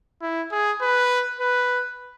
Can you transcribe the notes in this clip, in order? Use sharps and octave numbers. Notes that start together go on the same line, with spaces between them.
E4
G#4
B4
B4